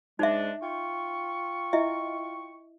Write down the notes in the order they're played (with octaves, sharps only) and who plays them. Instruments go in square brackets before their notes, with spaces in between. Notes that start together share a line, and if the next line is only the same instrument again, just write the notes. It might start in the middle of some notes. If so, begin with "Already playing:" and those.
[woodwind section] G#2 G#3 D4 [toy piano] D#4 E5
[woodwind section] F4 G5 C#6
[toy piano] E4 D#5 E5